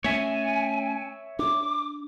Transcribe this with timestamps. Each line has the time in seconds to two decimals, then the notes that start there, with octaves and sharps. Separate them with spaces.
0.04 A3 C#4 C#5 E5 G#5
1.39 D4 D6